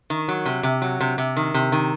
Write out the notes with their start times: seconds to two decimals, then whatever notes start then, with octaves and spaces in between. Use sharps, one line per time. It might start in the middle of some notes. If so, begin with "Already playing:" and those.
0.10 D#3
0.28 F#3
0.46 C3
0.63 C3
0.82 F#3
1.00 C3
1.18 C3
1.36 D#3
1.54 C3
1.72 D#3